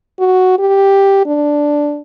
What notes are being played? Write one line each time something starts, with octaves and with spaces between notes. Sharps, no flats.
F#4
G4
D4